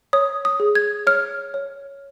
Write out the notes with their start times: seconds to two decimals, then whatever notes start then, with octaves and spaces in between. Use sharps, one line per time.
0.13 C#5 D#6
0.45 D#6
0.60 G#4
0.75 G#6
1.07 C#5 F6
1.54 C#5